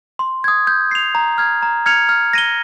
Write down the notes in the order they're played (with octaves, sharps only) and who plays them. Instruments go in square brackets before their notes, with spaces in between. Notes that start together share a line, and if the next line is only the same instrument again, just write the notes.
[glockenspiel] C6
D#6 G#6
G6
C7 F7
A#5
F6 G#6
A#5
F6 G#6 C#7 F7
F6
A#6 D#7 G7